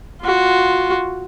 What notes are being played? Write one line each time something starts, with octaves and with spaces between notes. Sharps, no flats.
F4 F#4